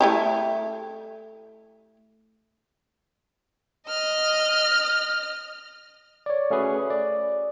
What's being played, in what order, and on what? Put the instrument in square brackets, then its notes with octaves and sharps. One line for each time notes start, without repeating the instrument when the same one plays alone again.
[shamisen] A3 E4 G4
[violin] D#5 F6
[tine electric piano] C#5 D5
A3 C#4 F#4 G#4 B4
D5